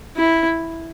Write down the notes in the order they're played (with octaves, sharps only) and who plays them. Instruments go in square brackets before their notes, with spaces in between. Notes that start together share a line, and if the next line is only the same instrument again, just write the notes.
[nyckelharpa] E4